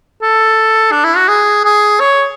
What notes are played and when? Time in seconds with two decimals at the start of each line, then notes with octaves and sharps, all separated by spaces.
0.22 A4
0.92 D4
1.04 E4
1.16 F#4
1.28 G#4
1.65 G#4
2.00 C#5